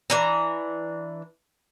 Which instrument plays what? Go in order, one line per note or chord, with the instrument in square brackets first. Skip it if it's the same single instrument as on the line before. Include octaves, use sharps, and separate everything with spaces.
[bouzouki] E3 D4 A#5